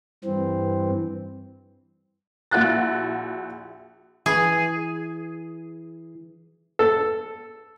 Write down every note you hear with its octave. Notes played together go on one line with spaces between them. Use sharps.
G2 E3 C4
A#1 E4 F#4 F#6 A6
E3 G#4
A4